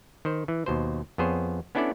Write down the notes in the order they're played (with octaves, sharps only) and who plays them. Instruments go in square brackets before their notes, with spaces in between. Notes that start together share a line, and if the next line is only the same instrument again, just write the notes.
[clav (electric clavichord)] D#3 C5
E3
D#2 B2 C5
F2 B3 G#4 C5 C#5
B3 C#4 D4 E4 A4 D5